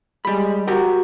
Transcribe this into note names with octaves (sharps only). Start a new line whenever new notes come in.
G3 G#3 B5
F#4 G4 A#4 A#5